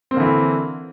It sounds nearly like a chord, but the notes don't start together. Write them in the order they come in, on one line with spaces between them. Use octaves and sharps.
C4 A#3 D3 E3